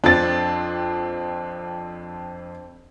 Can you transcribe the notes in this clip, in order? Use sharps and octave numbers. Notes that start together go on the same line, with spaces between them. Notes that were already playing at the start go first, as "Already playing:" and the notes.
F2 C4 D4 A6